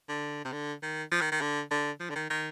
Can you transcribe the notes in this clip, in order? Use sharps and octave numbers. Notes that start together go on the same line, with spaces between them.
D3
C3
D3
D#3
F3
D#3
D#3
D3
D3
F3
D3
D#3
D#3